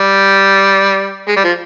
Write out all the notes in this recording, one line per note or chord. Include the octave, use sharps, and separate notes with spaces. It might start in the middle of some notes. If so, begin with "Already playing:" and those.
Already playing: G3
G#3
G3
F3